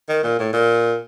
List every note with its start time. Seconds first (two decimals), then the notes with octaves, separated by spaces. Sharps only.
0.09 D#3
0.23 A#2
0.39 A2
0.53 A#2